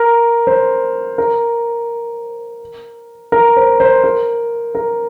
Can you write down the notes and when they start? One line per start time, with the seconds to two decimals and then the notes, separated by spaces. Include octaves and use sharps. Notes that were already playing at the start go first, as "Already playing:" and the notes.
Already playing: A#4
0.47 C5
1.18 A#4
3.32 A#4
3.57 C5
3.80 C5
4.04 A#4
4.75 A#4